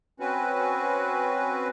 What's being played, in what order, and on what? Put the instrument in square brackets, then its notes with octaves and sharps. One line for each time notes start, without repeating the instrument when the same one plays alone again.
[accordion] C4 C#4 F#4 B4